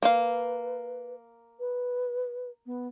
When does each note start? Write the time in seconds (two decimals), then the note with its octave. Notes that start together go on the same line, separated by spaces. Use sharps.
0.03 A#3 B4 F5
1.60 B4
2.66 B3